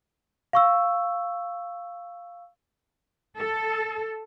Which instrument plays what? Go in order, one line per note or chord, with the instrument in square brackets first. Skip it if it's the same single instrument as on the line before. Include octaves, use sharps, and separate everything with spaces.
[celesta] F5 C#6 E6
[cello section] A4